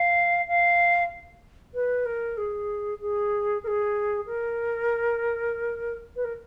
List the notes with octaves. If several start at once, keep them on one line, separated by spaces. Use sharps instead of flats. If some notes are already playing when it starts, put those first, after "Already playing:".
Already playing: F5
F5
B4
A#4
G#4
G#4
A#4
G#4
A#4
B4
A#4